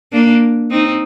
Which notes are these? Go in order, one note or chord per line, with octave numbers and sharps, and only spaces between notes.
A#3 D4
C4 D#4